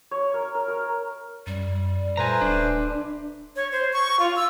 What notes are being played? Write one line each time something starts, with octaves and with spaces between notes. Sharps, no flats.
C#5
A#4
A#4
A#4
F#2 G3
A#2 A3 B4 C5 G#5 A#5
D1 D4
C#5
C5
C#6
F4
E6